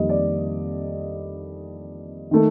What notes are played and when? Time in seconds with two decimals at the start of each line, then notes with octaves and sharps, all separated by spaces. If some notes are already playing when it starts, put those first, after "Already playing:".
Already playing: F2 D#3 G3 A#3 D#5
0.09 D5
2.31 D#3 A3